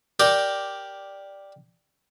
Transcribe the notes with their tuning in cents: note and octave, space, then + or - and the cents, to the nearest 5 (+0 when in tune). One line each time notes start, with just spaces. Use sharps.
G4 +0 A#4 +5 D5 +0